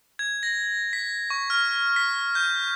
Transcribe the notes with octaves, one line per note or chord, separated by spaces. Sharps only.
G#6
A#6
B6
C#6
F6
B6
G6